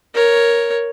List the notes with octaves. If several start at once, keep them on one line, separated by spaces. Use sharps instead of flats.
A#4 C#5